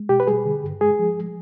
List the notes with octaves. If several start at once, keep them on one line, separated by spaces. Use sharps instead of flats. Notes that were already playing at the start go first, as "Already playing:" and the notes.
Already playing: G#3
B2 G4
B4
G3 G#4
D3
G2
G#3 G#4
F3